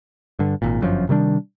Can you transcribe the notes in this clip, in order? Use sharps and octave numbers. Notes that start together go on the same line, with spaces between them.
G2 D3
G#1 A#2
G1 F#2 F3
C3 D#3 G3 D4